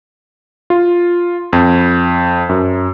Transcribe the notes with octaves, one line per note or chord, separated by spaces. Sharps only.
F4
F2
F#2